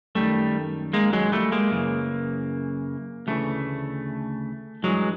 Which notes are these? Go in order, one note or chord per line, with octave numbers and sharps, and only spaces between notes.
F#2 D#3 G3 A3
G#3 A#3
F#3 G#3
G3 A3
G#3 A#3
F#2 C#3 E3
D2 C#3 E3 G3 A3
G2 E3 F#3 G#3